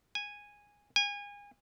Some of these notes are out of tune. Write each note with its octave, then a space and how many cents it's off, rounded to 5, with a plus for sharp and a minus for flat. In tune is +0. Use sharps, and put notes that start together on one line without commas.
G#5 -10
G#5 -30